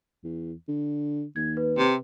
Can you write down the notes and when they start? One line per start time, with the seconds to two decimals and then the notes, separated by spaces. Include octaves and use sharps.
0.24 E2
0.68 D3
1.36 D#2 G#6
1.57 B4
1.78 C3